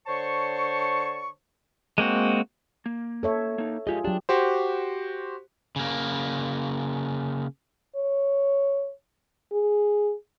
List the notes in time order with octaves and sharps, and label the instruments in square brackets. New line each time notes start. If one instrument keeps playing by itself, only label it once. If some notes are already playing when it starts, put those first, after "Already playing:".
[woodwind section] D3 C5 C#5 A5 C#6
[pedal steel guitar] G#3 A#3 C4 F#4
[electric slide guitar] A#3
[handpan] A4 C#5 E5
[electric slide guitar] A#3 D#4
[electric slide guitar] G#2 G4 D#5 [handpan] F4 G#4
[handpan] F#3 G4 [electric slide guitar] D4
[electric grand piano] F#4 G4 C5
[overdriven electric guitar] C#3 A#3
[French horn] C#5
G#4